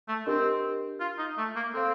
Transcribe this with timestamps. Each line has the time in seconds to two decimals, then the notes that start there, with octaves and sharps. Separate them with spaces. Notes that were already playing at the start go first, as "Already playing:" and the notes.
0.08 A3
0.27 C4 D4 G4 A#4 D#5
1.00 F4
1.19 D#4
1.38 A3
1.56 A#3
1.74 C4 A4 C5 F5